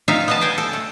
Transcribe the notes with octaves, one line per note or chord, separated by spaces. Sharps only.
C4 D#4 F4 E5 F5
B3 D#5 A5
C5 G5 G#5
A4
A3